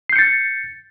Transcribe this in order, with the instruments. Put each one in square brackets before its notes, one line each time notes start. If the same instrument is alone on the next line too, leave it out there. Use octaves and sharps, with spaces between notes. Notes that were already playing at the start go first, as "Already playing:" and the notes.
[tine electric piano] C7
G6
C#7
A6